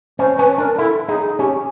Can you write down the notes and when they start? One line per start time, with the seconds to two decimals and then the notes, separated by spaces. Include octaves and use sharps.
0.19 C#4 C5
0.38 C#4 B4
0.58 D4 A#4
0.78 E4 A4
1.08 D#4 G#4
1.38 C#4 G4